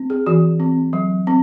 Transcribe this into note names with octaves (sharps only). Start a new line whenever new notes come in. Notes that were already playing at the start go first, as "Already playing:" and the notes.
Already playing: C4
G#4
E3 F#4
C4
F#3
C4